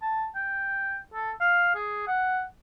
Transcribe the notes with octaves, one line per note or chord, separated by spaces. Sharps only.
A5
G5
A4
F5
G#4
F#5